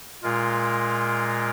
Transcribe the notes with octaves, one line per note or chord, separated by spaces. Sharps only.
A#2 G#3 F4 A#4